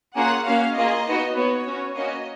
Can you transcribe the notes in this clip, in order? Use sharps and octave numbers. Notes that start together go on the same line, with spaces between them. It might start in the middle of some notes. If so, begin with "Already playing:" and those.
A#3 C#4 F4 G#4 F#5
A#3 C#4 F#4 F5
A#3 F4 G#4 D#5
B3 D#4 F#4
B3 F#4 C#5
C#4 F#4
A#3 C#4 F#4 D#5